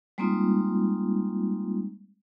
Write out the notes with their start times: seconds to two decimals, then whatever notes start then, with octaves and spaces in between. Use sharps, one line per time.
0.18 G3 G#3 A#3 C4 D#4 F4